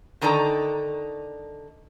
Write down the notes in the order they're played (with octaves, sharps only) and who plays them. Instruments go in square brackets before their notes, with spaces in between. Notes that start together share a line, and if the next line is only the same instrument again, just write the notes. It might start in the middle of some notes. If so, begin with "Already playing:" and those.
[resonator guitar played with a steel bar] D3 D#3 D#4 A4 D5 A#5